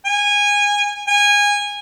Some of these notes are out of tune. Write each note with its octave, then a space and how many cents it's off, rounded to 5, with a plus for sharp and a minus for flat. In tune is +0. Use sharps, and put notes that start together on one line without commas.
G#5 -20
G#5 -20